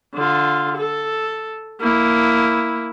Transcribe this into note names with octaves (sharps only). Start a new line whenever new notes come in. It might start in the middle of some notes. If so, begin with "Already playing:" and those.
D3 F4
A4
A#3 E4